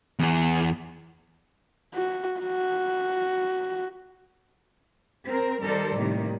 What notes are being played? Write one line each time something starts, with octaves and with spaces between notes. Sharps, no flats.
E2 G#4
F#4
F#4
C4 A#4
D#3 G3 A4 A#4 C5 D5
A2 C3 D#3 G3 A#3